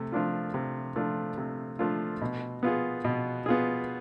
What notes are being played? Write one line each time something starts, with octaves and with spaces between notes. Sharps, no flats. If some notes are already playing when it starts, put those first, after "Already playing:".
Already playing: C3 A3
F3 A3 D4 F4
C3
F3 A3 D4 F4
C3
F3 A3 D4 F4
B2
B3 F4 G#4
B2
B3 F4 G#4